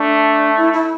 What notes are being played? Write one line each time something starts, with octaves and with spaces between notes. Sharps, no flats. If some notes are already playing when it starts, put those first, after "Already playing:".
Already playing: A3 D4
E4
E4